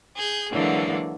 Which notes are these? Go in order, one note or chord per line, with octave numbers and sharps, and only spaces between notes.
G#4 G6
D3 E3 F#3 G#3 A#3 D4